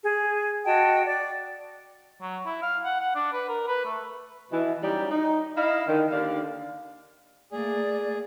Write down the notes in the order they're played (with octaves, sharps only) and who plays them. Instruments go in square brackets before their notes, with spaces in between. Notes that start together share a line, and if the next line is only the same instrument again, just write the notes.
[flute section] G#4
F#4 D#5 G5 A5
D5
[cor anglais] F#3
E4
F5
F#5
F#5
D4
B4
A#4
B4
A3
[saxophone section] B2 E3
F#3 G3 C#4 D#4 G4
D#4
E4 D#5 F5
D3 D#3
D#2 D3 D4 F5
[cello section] A3 A#3 [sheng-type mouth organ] G#4 [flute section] D5